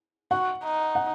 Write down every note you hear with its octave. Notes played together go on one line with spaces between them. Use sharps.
F#4 F#5
D#4
F#5